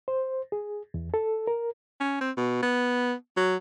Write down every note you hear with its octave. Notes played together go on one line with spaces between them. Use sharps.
C5
G#4
E2
A4
A#4
C#4
C4
B2
B3
F#3